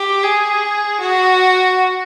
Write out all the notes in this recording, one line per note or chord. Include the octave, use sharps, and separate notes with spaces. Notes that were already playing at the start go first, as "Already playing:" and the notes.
Already playing: G4
G#4
F#4